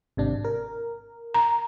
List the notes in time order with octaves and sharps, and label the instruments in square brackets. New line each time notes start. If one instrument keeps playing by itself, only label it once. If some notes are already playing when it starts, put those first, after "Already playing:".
[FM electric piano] G#1 C3 D4
A#4
[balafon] A#5